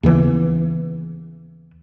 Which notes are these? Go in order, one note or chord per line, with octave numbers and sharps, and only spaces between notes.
D#2 C#3 E3 B3